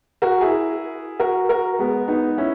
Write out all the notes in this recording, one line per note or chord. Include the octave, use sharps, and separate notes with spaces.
F#4 A#4
E4 G#4
F#4 A#4
F#4 A#4
G#3 B3
B3 D#4
C#4 E4